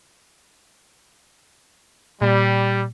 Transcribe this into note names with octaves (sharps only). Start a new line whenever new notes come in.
A#2 G3